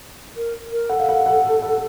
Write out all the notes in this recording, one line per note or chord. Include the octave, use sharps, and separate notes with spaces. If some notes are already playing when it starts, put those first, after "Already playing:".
A#4
A#4
A4 F#5
F5
F#5
F#5
F#5